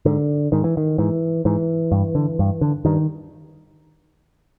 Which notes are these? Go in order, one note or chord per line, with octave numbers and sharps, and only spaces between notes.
G#2 D3
G#2 D#3
E3
D#3
G#2 E3
G#2 E3
G2
D3
G2
D3
G2 D#3